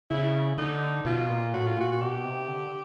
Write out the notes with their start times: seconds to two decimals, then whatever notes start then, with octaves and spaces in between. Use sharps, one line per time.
0.10 C#3 E4
0.58 D3 D#4
1.05 B2 F4
1.29 A#2
1.53 A2 F#4
1.66 F4
1.77 A#2 F#4
1.91 F#4
2.01 B2 G4
2.24 C3
2.48 D3